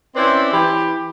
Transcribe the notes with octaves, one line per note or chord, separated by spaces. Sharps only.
C4 C#4 E4 B4 C5 D5
E3 G4 B5